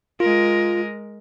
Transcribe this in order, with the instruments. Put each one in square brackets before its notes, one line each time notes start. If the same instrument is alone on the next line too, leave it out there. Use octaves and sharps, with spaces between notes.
[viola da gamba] G#3 A#4 [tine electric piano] F4